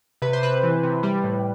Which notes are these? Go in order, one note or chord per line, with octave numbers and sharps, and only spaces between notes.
C3 B4
C5
C3 B4
E3
C3
G3
A2